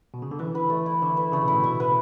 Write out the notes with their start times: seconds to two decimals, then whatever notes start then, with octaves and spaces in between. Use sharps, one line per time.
0.14 B2
0.22 C#3
0.31 D3
0.39 E3 E5
0.55 B4
0.70 A3
0.86 E4
1.02 D3 E5
1.17 B4
1.32 C#3 A3
1.42 B2
1.48 A2 E4
1.60 B2 E5
1.80 B4